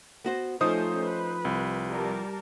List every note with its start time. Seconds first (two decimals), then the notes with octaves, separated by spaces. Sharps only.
0.24 B3 F#4 C5
0.61 F3 A3 C#4 D#4 F4 C5 D#6
1.03 B4
1.45 C2
1.89 G3 A#4 A5